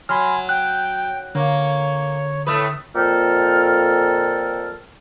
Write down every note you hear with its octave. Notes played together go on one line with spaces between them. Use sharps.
F#3 G#5 B5 C6 F6
G5 F#6
D3 A#3 C#5
A2 A3 B4 D#6
F2 A#2 A4 G5 F6